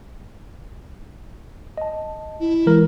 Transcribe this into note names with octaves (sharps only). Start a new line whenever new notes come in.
D#5 A5
E4
E3 G#3 A#4